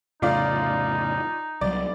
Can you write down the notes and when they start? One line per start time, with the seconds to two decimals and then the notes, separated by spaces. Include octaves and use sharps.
0.22 F1 A2 C#3 D#4 F4 D5 F5
1.61 C2 F#3 D5